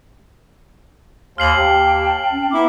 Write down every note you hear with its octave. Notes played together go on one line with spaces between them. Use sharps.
D#2 C6 F6 C7 F#7
D#2 G4 G5 A5
C#4
B3 E4 E5 A#5 D6